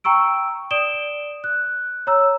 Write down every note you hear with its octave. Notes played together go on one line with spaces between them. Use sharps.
G5 A#5 C#6 E6 D7
D5 D#6 D7 E7 G7
F#6
C#5 A#5 E6